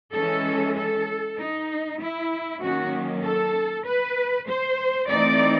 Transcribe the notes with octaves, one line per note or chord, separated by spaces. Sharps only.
E3 G#3 C#4 A4
A4
D#4
E4
D#3 F#3 A#3 C#4 F#4
A4
B4
C5
E3 A3 C4 D#4 D5